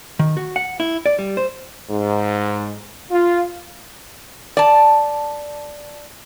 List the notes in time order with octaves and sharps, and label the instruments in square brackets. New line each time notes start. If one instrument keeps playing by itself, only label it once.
[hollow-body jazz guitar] D#3
F#4
F#5
E4
D5
G3
C5
[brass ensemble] G#2
F4
[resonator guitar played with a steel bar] D5 A5